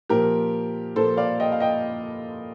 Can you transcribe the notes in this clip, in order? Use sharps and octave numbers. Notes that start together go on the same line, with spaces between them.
A#2 F3 A#3 G4 A#4
A#2 F3 A#3 A4 C5
D5 F5
D#5 G5
F5
D#5 G5